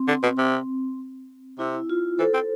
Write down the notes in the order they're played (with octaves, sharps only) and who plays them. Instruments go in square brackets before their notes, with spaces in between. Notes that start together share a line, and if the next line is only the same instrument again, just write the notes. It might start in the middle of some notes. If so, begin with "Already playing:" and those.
Already playing: [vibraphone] C4
[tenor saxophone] D3
B2
C3
[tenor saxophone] C3 [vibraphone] E4
[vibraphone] F4
[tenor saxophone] E3 [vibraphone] A4 C5
[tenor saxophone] C4